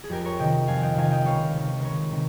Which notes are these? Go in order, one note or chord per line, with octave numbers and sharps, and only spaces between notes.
G#4
F2 G4 A#4
A#4 C#5
C3 D#3 D#5 G5
F2 F5 G#5
D#5 G5
C3 D#3 F5 G#5
D#5 G5
C#2 C#5 F5
C3 D#3
C#2 A#4 C#5
C3 D#3